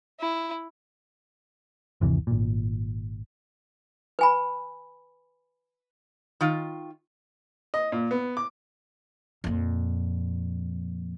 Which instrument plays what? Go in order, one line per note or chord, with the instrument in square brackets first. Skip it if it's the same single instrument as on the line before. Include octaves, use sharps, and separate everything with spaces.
[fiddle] E4
[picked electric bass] G1 D#2 C3 E3
G#1 A#2
[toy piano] B4 G#5 B5
[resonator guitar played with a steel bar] D#3 F4
[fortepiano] D#5
A#2
B3
D6
[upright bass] F2 A#2